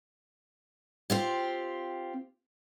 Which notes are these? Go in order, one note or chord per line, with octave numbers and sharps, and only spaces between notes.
C4 F4 G4